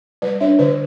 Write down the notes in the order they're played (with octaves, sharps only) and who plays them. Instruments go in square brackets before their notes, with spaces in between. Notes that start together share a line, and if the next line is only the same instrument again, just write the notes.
[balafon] G3 B4 D5
D4 C#5 E5
D3 B4 D5